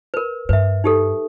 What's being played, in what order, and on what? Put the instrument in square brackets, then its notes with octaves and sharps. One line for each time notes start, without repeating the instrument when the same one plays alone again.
[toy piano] A#4 B4
[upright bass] G2 [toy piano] B4 E5
[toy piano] D#4 G4 A4